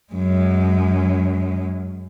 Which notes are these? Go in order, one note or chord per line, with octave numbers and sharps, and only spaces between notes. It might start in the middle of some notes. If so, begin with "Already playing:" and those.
F#2 G#3